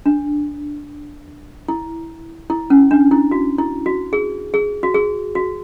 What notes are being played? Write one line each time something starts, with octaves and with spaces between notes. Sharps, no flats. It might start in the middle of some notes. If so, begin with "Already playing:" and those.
D4
E4
E4
C#4
D4
E4
F#4
E4
F#4
G#4
G#4
F#4
G#4
F#4